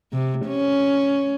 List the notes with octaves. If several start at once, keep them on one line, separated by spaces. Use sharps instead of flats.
C3
C#4